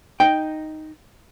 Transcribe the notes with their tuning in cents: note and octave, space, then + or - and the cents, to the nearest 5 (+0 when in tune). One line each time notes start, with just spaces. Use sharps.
D#4 +0 G5 +0